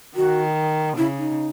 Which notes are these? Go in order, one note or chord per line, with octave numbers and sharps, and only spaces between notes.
D#3 F#4
C#3 E4
D#4